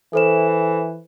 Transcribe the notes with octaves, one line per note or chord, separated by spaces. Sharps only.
E3 A4 C5 E7